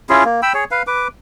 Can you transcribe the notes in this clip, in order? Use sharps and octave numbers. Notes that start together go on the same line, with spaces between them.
C#4 E4 F4 G#4
A#3
G5 B5 E6
G#4 C#5
B4 F5
B4 D6